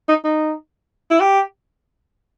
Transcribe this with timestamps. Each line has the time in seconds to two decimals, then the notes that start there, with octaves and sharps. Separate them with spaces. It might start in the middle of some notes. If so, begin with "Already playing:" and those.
0.09 D#4
0.24 D#4
1.11 E4
1.21 G4